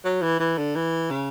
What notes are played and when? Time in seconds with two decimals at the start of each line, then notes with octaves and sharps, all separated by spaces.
0.05 F#3
0.22 E3
0.40 E3
0.58 D3
0.76 E3
1.11 C#3